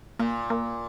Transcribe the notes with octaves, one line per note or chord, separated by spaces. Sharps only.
A#2 A#3
A#3